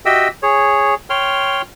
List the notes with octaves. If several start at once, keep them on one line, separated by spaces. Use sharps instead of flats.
F#4 G4 D#5 E5 G5 E6
G#4 C#5
C#5 G5 C6 F6